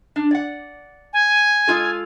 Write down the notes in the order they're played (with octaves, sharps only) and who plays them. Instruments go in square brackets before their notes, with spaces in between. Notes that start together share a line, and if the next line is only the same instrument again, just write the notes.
[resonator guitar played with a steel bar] D4
D5 F#5
[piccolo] G#5
[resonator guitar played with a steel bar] G#3 F4 A4